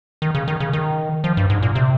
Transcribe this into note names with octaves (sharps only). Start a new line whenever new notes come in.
D#3
C#3
D#3
C#3
D#3
F3
G2
G#2
A#2
C3